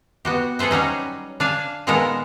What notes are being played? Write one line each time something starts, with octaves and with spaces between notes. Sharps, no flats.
B3 F#4 G4
G#4 A4 B4 C5 E5
F#3 G3 C#4 D#4
D4 F5 G#5 A5
A#2 D#3 G#3 B3 A4 A#4